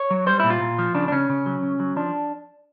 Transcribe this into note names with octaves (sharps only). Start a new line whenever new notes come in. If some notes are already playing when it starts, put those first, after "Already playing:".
Already playing: C#5
F#3
G3 C5
A#2 E4
F4
A#2
F3
C#3 D4
D4
C#3 C#4
C#3
F#3
C#3
F#3
F3 D4